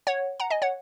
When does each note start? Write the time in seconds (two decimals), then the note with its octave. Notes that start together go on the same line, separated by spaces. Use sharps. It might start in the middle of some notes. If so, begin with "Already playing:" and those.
0.07 C#5 F#5
0.40 F#5 A#5
0.50 D#5 G#5
0.62 C#5 F#5